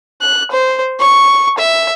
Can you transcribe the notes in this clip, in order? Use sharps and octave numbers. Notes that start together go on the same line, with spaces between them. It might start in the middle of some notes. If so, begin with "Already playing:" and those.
F#6
C5
C#6
E5